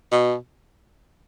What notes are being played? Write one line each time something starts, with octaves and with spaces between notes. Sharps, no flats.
B2